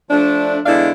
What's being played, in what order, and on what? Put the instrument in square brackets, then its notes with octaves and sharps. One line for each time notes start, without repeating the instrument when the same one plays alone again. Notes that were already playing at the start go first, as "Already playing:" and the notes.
[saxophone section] F3 A3 D4
E2 D3 G#3 D4 E4 F5